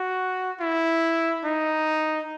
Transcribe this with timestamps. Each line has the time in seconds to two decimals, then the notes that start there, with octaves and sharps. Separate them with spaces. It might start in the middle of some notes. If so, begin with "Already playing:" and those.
Already playing: F#4
0.61 E4
1.45 D#4